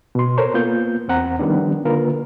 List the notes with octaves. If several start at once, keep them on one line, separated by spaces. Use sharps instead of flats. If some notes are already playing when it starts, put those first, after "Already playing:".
B2 C6
A4 A#4 C5 C#5
A#3 B3 F4 G6
E2 C4 F#5 A#5
D#3 F3 G3 B3 C#4 D4
D3 A#3 F4 A#4 B4